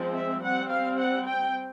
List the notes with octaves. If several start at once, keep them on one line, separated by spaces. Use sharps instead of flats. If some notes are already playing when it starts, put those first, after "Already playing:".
Already playing: F3 G#3 C4
E5
G3 C4 F#5
F5
F#5
G5